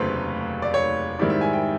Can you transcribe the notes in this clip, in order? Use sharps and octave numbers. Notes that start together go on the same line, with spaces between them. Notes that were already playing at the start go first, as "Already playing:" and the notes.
Already playing: F1 D#2 C#3 F#3 A3 B4 C5
D5
C#5
G#2 D#3 G3 C4 E4 D5
E5
G#5
G5